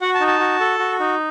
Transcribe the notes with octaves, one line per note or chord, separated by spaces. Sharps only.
F#4 F#5
A5
D#4
A5
F#4
A4
F#4
D#4